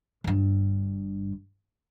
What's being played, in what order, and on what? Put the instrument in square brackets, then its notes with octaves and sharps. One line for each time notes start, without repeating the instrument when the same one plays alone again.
[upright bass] G1 G2